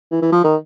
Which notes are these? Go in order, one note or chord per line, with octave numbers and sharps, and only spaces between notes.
E3
E3
F3
D#3